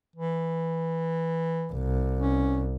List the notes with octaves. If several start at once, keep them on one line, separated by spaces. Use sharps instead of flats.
E3
C2
C#4